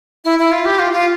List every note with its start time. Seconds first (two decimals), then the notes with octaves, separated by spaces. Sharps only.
0.25 E4
0.39 E4
0.52 F4
0.65 G4
0.79 F4
0.93 F4